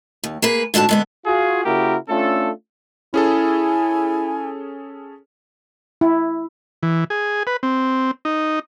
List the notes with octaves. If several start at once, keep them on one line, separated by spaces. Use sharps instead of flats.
D#2
A#3 G#4 B4
G#2 D3 D4 F#4 A5
D3 G#3 B3
F4 F#4 G#4
C#3 A#3 E4 F#4 G4 A#4
A3 C#4 D4 F4 A4
C#4 E4 G#4 A4 G#5
E4
E3
G#4
B4
C4
D#4